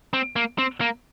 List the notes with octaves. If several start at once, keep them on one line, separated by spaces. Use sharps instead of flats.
C4
A#3
C4
A#3